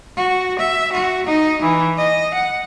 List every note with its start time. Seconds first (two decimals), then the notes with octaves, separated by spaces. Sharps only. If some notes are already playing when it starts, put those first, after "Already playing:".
0.17 F#4
0.59 E5
0.92 F#4
1.26 D#4
1.62 E3
1.97 D#5
2.34 F#5